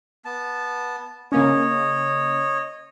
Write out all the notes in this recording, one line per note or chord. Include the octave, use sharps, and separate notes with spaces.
B3 A5
C#3 A#3 C#4 C#5 D#5